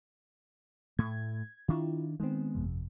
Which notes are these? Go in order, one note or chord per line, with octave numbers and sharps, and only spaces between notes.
A2 A3 G#6
D#3 D4 E4 F4
D#3 G#3 B3 C4
G1 F2 C3